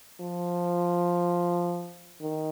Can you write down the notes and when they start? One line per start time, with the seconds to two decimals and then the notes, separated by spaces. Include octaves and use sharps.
0.20 F3
2.21 D#3